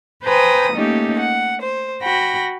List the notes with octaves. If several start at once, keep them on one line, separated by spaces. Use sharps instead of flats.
B4 C5 G5 G#5 A#5 D#6
A3 A#3 C#4 D#4 G4
F#5
C5
F#4 G5 B5 A#6